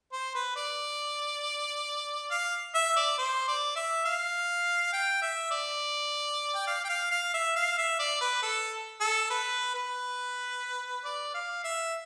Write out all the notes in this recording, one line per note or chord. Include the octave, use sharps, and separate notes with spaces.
C5
B4
D5
F5
E5
D5
C5
D5
E5
F5
G5
E5
D5
G5
F5
G5
F5
F5
E5
F5
E5
D5
B4
A4
A4
B4
B4
D5
F5
E5